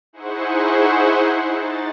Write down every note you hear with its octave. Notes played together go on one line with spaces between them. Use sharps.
D#4 E4 G#4 C5 F#5 C#6
D#4 A6